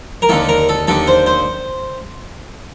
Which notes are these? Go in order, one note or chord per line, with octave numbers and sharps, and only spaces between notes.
A#4
D#2 D3 A4
A#4
A4
D#2 D3 A4
C5
C5